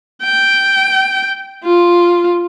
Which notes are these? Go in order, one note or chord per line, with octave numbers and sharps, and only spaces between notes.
G5
F4